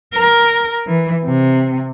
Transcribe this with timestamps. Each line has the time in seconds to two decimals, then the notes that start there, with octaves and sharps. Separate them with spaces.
0.14 A#4
0.87 E3
1.25 C3